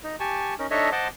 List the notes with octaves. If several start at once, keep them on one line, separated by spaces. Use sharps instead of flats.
D#4
G4 G#5 A5 C#6
C#4 D#4 A#4
D4 D#4 A4 C#5 D#5 E5
C5 D#5 F#5 A5 C6 D6